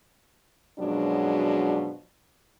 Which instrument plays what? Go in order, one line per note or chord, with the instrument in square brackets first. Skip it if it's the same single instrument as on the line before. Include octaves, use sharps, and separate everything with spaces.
[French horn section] F#2 B2 F3 F#3 G#3 D4